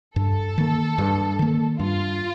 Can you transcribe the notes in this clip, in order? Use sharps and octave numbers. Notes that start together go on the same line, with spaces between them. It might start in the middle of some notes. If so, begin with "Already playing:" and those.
G2 A4
D#3 A#3
G2
D#3 A#3
G2 F4